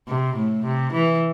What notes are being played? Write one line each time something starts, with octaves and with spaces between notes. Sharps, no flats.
C3
A2
C3
E3